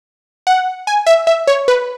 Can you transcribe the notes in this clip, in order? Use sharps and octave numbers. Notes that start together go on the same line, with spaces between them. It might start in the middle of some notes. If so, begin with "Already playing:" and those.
F#5
G#5
E5
E5
C#5
B4